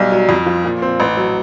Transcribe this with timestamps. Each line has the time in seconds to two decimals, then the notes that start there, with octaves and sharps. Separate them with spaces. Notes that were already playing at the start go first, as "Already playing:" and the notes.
Already playing: B1 G3
0.12 F#3
0.29 F2
0.46 F3
0.64 A#2
0.82 C4
1.00 A1
1.17 F#3